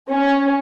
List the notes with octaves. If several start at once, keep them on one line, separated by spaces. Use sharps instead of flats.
C#4